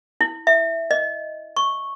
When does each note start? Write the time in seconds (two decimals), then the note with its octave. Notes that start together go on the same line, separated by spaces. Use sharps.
0.21 E4
0.47 E5
0.91 D#5
1.57 C#6